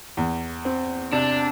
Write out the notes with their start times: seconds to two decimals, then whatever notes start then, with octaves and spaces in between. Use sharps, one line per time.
0.17 E2
0.65 C4
1.12 C3 D4